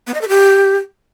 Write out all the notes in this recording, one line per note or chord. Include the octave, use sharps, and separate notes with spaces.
B3
D#5
A4
G4